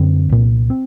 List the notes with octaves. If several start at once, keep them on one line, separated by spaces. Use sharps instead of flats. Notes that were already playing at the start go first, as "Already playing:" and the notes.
Already playing: F#2 D3 C4
C2 A#2
C4